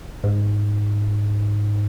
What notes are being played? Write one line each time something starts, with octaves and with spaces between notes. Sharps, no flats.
G#2